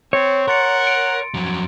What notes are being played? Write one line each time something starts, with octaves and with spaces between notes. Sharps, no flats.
C4 C#5
A#4 F#5 C6 A6 C#7
D7
F2 F#3